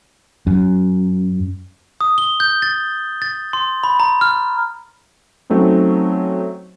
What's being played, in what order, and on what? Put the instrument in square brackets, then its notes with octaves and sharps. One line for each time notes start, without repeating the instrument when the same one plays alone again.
[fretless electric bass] F#2
[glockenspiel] D#6
G7
G6
A6
A6
C6
B5
A#5
F6
[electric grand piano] F#3 A3 C4 C#4 D#4